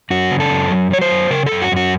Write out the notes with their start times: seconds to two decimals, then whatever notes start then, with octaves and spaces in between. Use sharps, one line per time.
0.10 F#2 F#4
0.31 C#3
0.40 A4
0.51 F#2
0.71 F#3
0.91 F#3 C#5
1.01 C5
1.11 F#2
1.30 C#3 A#4
1.46 A4
1.52 F#2
1.62 F#4
1.72 F#2 F#4